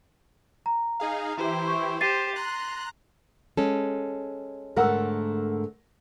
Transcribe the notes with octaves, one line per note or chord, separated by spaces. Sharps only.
A#5
D#4 G#4 F5
E3 E4 G4 C5
C#6
G4 C5 A6 C7 D#7
A#5 C6 F#6
G#3 C#4 A4
G#2 D3 A3 A#4 F#5 E6